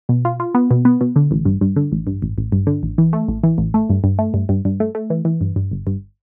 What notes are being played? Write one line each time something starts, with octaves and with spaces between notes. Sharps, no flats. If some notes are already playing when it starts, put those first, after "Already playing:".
B2
F4
F4
B3
B2
B3
B2
D3
A1
G2
G2
D3
A1
G2
A1
A1
G2
D3
A1
E3
A3
A1
E3
A1
A3
G2
G2
A3
G2
G2
G2
A3
A3
E3
E3
G2
G2
G1
G2